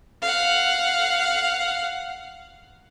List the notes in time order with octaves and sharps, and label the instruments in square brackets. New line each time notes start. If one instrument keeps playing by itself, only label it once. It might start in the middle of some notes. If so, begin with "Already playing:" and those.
[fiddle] F5 F#5